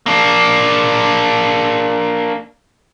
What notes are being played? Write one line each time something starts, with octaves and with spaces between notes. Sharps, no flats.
A#3 D4